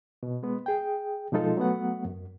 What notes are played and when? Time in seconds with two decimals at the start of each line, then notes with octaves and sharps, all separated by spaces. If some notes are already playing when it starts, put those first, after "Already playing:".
0.23 B2
0.43 G#3 B3
0.66 G#4 G5
1.32 B2 F3 G#3 D#4 F4 A4
1.57 F#3 A3 B3 F#5
2.05 F#2